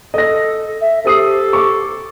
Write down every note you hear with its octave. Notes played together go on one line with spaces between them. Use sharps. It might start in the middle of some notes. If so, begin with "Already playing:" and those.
A4 D#5 A#6
E5
G4 A4 C5 D#6 C7
C#6 D6